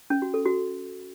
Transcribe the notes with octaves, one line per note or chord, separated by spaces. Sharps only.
C#4
F#4
A4
F#4